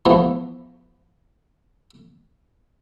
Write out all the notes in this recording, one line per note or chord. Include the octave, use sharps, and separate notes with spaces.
E3 F3 A3 B3